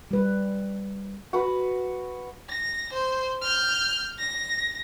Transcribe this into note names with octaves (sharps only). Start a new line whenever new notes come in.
G3 B4
F#4 B4
A#6
C5
F6 G6
A#6